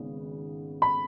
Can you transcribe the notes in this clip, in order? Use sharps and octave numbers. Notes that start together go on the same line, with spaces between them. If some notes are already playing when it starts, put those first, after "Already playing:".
Already playing: G#1 C#3 B3
B5